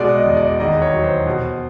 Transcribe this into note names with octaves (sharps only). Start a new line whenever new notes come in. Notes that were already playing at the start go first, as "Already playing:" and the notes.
Already playing: B2 G#3 D5
D#5
E2
D5
D#2 D#5
C#5
F#3
C5
B2